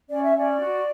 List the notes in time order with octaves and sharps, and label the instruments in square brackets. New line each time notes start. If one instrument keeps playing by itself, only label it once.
[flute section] C#4 D5
E5
C#4 D5
F#4